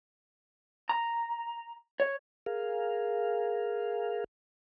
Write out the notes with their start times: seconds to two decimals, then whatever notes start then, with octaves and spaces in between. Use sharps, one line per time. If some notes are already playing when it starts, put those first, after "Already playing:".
0.89 A#5
2.00 C#5
2.46 G#4 A#4 F5